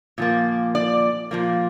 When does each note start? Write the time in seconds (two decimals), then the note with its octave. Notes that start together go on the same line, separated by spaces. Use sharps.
0.18 A#2 F3 A#3
0.75 D5
1.31 A#2 F3 A#3